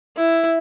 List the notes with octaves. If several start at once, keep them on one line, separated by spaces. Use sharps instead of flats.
E4